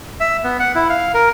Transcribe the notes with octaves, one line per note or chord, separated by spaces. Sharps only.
E5
B3
F#5
E4
F5
A#4